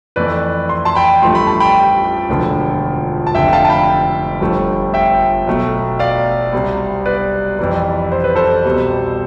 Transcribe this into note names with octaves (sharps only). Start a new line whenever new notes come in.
F2 E3 A3 B4 D5
C6
A5 C6
G5 B5
A1 G2 F3 A3 C6
B5
A5
G5 B5
E1 D2 D3 F3
A5
F1 F2 D3 E5 G5
F5 A5
A5
G5 B5
G1 G2 F3 A3
E5 G5
B1 B2 A3
D5 F5
C2 C3 G3
B4 D5
F2 C3 E3 G3
C5
B4
A4 C5
C2 B2 G3